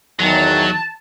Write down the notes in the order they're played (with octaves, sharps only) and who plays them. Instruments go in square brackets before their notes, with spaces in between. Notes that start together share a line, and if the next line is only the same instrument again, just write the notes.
[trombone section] E2 D#3 [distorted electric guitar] F#3 [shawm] A5